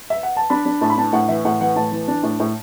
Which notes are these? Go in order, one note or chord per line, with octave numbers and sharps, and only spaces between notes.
E5
F#5
A5
D4 B5
D4
A2 A5
B5
D4 A5
A2 F#5
E3 E5
A2 F#5
E3 F#5
A2 A5
E3
D4
A2
A2